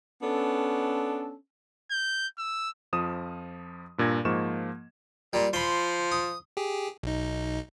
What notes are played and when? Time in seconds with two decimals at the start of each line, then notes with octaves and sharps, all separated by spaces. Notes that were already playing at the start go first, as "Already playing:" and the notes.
0.22 B3 C#4 D4 A4
1.90 G6
2.38 E6
2.93 F2 F3 D#6 E7
3.98 G2 A#2 D4 G#6 A#6
4.25 G#2 F3 A#3 C#6 E7
5.33 A#2 G3
5.53 F3 B5 C6
6.12 D#6
6.57 G4 G#4
7.03 B1 D#4